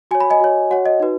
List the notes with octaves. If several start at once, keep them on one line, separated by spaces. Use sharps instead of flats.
F#4 C#5 G#5
B5
D#5 G#5
F#4 C#5
F#4 C#5 F#5
D#5
D#4 F#4 B4